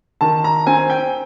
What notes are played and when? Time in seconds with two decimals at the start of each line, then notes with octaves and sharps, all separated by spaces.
0.21 D#3 A5
0.44 A#5
0.67 C4 G#5
0.90 G5